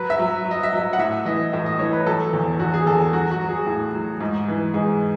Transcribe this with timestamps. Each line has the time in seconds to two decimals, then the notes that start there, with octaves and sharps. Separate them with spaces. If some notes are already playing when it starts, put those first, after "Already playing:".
Already playing: F#3 B4
0.10 E5
0.19 F#3
0.45 F#3
0.51 D#5
0.63 E5
0.73 F#3
0.82 E5
0.93 F#5
0.99 A2 E5
1.25 E3 D#5
1.53 A2 E5
1.66 D#5
1.79 E3 C#5
1.93 B4
2.06 F#3 A4
2.33 E2
2.59 E2 F#4
2.74 G#4
2.86 E2 A4
3.01 G#4
3.13 F#3 F#4
3.31 F#4
3.41 F#3
3.49 G#4
3.67 A2
3.94 F#3
4.20 G#2
4.48 E3
4.74 G#2 G#4